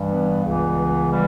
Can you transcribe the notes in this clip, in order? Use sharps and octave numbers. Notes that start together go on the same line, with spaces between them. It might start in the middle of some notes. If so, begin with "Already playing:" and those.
Already playing: G2 E3 G3
B3
C#2 C#3 E3
C#3 E3 G3